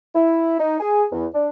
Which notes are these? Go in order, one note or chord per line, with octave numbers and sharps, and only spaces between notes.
E4
D#4
G#4
E2
D4